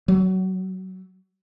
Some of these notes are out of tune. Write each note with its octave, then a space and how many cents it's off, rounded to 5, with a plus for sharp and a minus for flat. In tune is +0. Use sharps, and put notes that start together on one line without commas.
F#3 +20